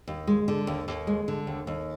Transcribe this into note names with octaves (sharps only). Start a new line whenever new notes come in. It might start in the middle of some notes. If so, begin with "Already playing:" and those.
D#2
G#3
D3
D#2
D#2
G#3
D3
D#2
D#2